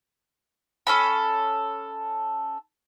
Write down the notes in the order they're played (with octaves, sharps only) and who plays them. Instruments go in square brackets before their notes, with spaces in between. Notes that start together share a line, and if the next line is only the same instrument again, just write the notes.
[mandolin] C#4 A4 B5